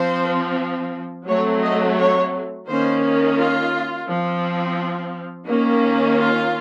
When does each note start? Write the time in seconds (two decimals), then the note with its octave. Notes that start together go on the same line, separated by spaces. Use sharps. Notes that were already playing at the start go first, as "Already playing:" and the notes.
Already playing: F3 C4 C5
1.27 F#3 A3 C4 C#5
1.62 D#5
1.98 C#5
2.68 D#3 A#3 C#4 C5
3.38 F4
4.07 F3 C4
5.48 D#3 A#3 C#4
6.18 F4